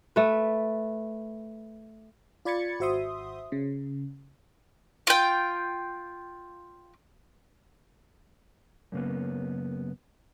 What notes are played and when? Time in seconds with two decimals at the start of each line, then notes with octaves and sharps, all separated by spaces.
0.16 A3 B4
2.45 F4 D5 B5 G#6 A6 C#7
2.79 G#1 F#4 C5 E5 C6 D#6
3.52 C#3
5.07 F4 G5
8.92 F#2 C#3 A#3 B3